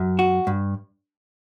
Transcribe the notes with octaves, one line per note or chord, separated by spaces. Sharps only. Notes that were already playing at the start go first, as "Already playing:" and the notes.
Already playing: F#2
F#4
G2